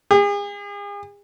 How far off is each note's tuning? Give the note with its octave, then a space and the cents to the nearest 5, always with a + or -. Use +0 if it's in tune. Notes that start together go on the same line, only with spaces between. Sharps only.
G#4 -40